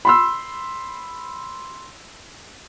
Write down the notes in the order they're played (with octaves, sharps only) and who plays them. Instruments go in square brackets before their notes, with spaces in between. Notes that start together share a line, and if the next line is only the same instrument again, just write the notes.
[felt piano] B5 C6 E6